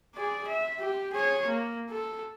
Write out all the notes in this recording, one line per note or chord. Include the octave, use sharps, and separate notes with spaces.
G#4 D5
E5
G4
G#4 C#5
A#3
A4